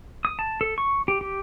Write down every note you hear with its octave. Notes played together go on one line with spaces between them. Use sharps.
D#6
A5
A4
C#6
G4
G4